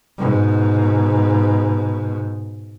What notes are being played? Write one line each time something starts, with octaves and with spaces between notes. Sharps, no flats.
G#2 B2